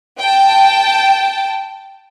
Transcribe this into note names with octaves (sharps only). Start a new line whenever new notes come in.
G5 A5